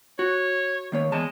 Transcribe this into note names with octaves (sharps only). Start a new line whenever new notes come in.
F#4 C#5
D#3 A#3 C#5
E2 G#3 A5